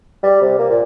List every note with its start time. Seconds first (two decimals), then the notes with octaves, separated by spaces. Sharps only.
0.23 G3
0.42 C3
0.59 A#3
0.70 A#2